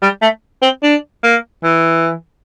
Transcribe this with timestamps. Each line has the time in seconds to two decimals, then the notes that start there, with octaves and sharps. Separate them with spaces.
0.02 G3
0.22 A3
0.62 C4
0.83 D4
1.23 A#3
1.63 E3